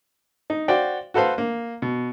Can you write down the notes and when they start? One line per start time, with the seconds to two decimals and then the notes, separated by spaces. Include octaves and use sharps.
0.50 D#4
0.68 F#4 C5 D5 F5 G5
1.14 F#4 A4 B4 C5 F5
1.38 A#3
1.82 B2